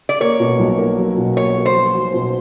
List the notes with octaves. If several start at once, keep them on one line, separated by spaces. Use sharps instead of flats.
D5
A#3 C#5
B2
B1
A#3
F#3
B2
A#3 C#5
A#3
C5
F#3
F#3
B2